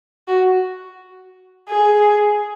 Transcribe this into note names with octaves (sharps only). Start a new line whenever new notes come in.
F#4
G#4